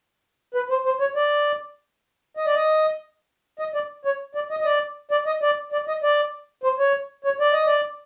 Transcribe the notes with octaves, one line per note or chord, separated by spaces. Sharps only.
B4
C5
C5
C#5
D5
D#5
D5
D#5
D#5
D5
C#5
D5
D#5
D#5
D5
D5
D#5
D5
D5
D#5
D5
C5
C#5
C#5
D5
D#5
D5